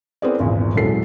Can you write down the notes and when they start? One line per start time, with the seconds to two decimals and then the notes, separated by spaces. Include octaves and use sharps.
0.22 B3 C4 E4 G#4 A#4 D5
0.40 G#1 E2 A#2
0.75 D#1 F#3 G#3 E4 A4 C7